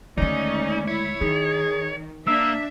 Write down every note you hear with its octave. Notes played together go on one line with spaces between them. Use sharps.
D#2 D3 G#3 A3 C#4 D#4 D5
E4 C#5
D#3 D#4 G#4
A#3 D4 E5 E6